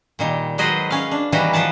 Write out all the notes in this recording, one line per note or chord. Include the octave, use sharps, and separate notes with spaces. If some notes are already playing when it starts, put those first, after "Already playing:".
A#2 D#3 G3
F#3 G#3 G#4 B4 C5 D#5
C#4 F5
D4
D#3 E3 G3 A#3 F#4 B4
F3 B4 F#5 A5